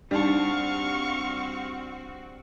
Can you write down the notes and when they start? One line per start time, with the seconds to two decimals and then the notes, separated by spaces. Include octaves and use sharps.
0.11 G3 C4 D4 D#4 F#4 F5 A5 C#6